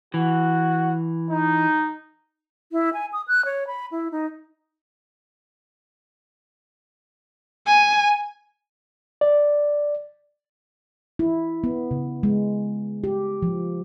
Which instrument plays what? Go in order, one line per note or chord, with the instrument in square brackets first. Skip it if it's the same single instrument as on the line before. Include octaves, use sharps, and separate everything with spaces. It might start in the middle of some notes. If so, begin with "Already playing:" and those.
[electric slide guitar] E3 [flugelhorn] F#4
[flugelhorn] D#4
[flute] E4
G#5
D#6
F#6
C#5
B5
E4
D#4
[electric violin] G#5
[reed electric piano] D5
[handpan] E4
B3
C#3
G#3
G4
F3